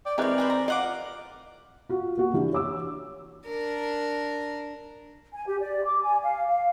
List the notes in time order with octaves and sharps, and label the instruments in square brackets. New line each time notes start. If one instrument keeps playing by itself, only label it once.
[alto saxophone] D5 [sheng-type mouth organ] G5
[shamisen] E3 G#3 D#4 [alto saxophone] C4 [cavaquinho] G4 C#5 [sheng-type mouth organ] A#4 D5
[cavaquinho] G#4 B4 C5
E5 A#5
[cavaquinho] F4 F#5 D6 [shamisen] D#5
[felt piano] F4 F#4
A#3 F#4
E3 D4 G4
C#5 D6 E6
[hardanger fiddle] D4 A#4
[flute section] G#5
G4
D5
D6
G#5
F5
F5